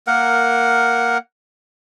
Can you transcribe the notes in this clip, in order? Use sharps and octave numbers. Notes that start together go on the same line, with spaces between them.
A#3 A#4 F#5